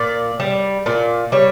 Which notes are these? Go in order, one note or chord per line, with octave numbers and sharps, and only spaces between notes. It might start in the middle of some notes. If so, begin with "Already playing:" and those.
Already playing: A#2 D5
G3
A#2 D5
G3 C#5